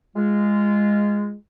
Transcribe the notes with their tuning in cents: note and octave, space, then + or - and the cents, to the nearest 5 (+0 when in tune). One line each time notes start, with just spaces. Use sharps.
G#3 -10 F4 -15